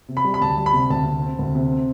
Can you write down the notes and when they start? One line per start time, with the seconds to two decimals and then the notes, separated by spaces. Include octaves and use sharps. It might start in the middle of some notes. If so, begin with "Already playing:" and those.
0.08 C3
0.17 B5
0.24 G3
0.34 B5
0.41 D2 A5
0.57 G3
0.66 B5
0.73 C3
0.90 D2 A5
1.05 C3
1.22 C4
1.39 D2
1.55 C3
1.72 C4